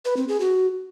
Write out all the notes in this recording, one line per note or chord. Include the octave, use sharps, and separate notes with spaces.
B4
C4
G#4
F#4